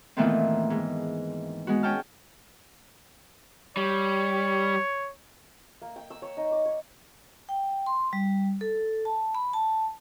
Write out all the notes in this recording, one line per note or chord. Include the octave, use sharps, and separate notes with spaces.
A#2 D#3 E3 A3 B3 C4
G#2
G#3 B3 F#4
C#4 C#5 G5 A5 F6
G3 C#5
A#3
G5
E6
C#5
D#4
D6
C#5
G5
C6
G3
A4
A5
B5
A5